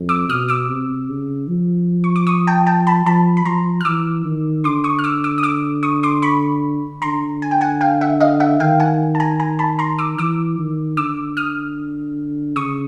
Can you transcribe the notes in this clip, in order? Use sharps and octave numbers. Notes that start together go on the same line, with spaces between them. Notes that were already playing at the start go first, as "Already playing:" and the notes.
Already playing: F2
D6 E6
B2 D#6 F6
D6 E6
C3
C#3
F3
C#6
D6
C#6 D#6
G5 A5
G5 A5
A5 B5
F3 A5 B5
B5
F3 A#5 C6
F6
E3 D6 E6
D#3
D3 C6 D6
C#6 D#6
F6
D6 E6
D6 E6
D#6
D6 E6
C#6 D#6
C6 D6
B5 C#6
D3 A#5 C6
G#5
G5
F#5 G#5
F5 G5
E5 F#5
D#5 F5
E5 F#5
D#3 F5 G5
F#5 G#5
A5
G#5 A#5
G#5 A#5
A5 B5
A#5 C6
D6 E6
E3 D6 E6
D#3
D3 D6 E6
D#6 F6
C#3 C#6 D#6